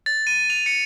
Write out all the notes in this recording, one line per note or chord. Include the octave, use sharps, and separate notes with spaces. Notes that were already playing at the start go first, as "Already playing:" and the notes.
A6
D#7
F7
C#7